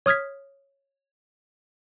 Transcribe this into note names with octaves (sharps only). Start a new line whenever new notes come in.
C#5 D#6 F6 G#6 B6